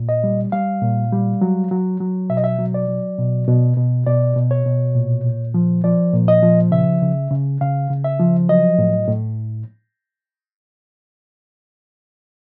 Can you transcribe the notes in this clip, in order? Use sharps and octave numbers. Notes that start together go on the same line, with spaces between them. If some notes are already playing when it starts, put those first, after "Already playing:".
Already playing: A#2
D#5
G3
G3 F5
A#2
G3
F#3
F#3
F#3
B2 E5
D#5
E5
F#3
D5
F#3
B2
B2
B2
B2 D5
B2
C#5
B2
A#2
A#2
F3
F3 D5
A#2
D#5
F3
C#3 E5
C#3
C#3
C#3 F5
C#3
E5
F3
F#3 D#5
A2
A2